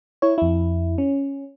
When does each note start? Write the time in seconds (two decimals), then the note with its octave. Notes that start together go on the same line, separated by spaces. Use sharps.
0.22 E4 C#5
0.38 F2 E4
0.98 C#4